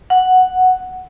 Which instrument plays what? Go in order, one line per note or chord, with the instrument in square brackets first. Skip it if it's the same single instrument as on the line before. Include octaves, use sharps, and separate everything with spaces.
[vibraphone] F#5